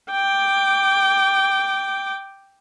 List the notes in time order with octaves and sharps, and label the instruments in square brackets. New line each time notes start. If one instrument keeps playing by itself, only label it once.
[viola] G5 D6